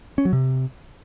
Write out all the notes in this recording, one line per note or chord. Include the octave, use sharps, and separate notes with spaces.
C#4
F#3
C3